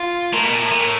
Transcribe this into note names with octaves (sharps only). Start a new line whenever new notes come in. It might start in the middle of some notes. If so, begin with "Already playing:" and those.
Already playing: F4
A2 A#4
B2
A#2
A2
A#2
A2